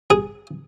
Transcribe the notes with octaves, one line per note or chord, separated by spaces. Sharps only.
G#4